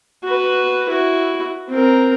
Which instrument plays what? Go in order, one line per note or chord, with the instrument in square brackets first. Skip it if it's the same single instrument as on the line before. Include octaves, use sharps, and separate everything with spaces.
[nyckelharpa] F#4 B4
E4 F#4
C4 A#4